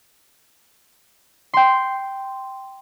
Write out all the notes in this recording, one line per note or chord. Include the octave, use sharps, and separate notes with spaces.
G5 C6